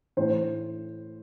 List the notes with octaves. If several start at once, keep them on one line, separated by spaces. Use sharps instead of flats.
A2 E3 C5